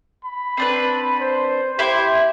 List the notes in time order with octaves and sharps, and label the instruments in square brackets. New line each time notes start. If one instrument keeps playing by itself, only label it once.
[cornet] B5
[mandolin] C4 D4 B4
[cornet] C5
[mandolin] E4 C5 [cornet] G4